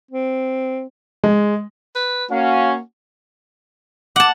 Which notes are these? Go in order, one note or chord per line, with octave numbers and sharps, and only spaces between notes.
C4
G#3
B4
A#3 C#4 F#4 F5
F#5 A5 D6